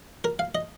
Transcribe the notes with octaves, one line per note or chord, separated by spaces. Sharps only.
A#4
F5
D#5